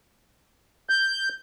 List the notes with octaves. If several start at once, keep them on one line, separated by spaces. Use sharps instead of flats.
G6